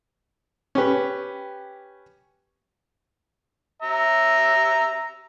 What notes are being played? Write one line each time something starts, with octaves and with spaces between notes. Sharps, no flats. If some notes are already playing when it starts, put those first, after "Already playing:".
C#4 G4 B4
E5 A#5